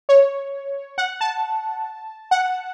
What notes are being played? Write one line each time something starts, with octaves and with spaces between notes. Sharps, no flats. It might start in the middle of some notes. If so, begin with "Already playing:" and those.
C#5
F#5
A5
F#5